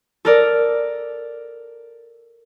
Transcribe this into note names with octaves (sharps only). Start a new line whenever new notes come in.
A4 A#4 D5